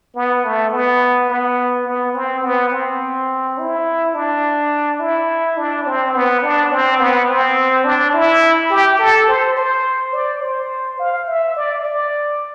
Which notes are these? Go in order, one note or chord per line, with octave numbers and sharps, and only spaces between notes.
B3
A3
B3
B3
B3
C4
B3
C4
E4
D4
E4
D4
C4
B3
D4
C4
B3
C4
D4
E4
G4
A4
C5
C5
D5
C5
F5
E5
D5
D5